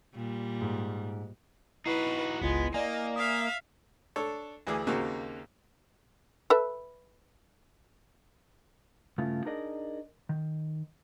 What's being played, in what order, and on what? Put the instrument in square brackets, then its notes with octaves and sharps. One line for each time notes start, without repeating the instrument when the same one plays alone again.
[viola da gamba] A#2 G3
[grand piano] G#2
[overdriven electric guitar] D#4 F#4 [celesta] E4 C7 [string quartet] B4
[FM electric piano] G1 C#2 F4 [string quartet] G#3 [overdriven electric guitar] B3
[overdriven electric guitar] A#3 [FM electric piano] D5 G#5 [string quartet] D#5
[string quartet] E5 F5 [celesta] D#6
[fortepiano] D4 A4 C#5
D2 E3 G#4 D6
D#2 C#3 A#3 C4 F#4
[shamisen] A4 B4 E5
[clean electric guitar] G2 C#3 A3 E4 F4
D4 D#4 G#4 A#4 D5 D#5
D#3